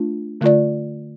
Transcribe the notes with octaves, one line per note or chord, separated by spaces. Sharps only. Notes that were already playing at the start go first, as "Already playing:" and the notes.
Already playing: A3 D4 F4
D3 A3 F4 D5